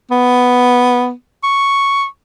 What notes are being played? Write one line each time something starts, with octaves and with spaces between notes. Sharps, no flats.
B3
C#6